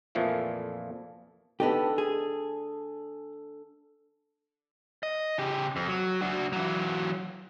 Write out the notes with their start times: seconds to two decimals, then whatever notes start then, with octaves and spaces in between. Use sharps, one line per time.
0.15 F2 A#2 E3 F3 A3
1.60 B3 D4 D#4 G4 A4
1.98 G#4
5.03 D#5
5.38 C#3 G4
5.76 F2
5.88 F#3
6.21 D4 F#4
6.53 E3 F#3